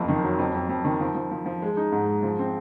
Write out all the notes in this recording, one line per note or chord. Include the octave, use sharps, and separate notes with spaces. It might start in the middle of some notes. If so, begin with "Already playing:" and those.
Already playing: F#1 F2 F3
D#3
F#3
F2
F2
F2
D#3
F3
F3
F3
F3
G#3
D#4
G#2
G#3
F3
C4